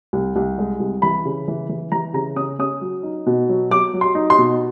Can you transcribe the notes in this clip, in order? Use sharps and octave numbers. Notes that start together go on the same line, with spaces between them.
C2
C2
G#3
C2
E3 B5
C#3
E3
E3
E3 A#5
C#3 A#5
C#4 D#6
C#4 D#6
F#3
D#4
B2
F#3
F#3 D6
F#3
C6
D#4
C6
B2